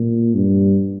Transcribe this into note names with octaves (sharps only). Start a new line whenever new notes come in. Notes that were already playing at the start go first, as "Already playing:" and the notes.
Already playing: A#2
G2